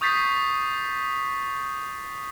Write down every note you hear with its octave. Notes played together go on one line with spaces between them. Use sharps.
C#6 D#6 G6 A6 B6 C7